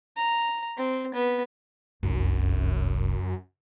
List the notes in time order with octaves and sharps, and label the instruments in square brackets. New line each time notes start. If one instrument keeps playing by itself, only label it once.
[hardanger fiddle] A#5
C4
B3
[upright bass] F1 C2 [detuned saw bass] F#2